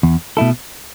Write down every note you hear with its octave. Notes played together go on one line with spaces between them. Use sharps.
E2
B2 A3 E4 A4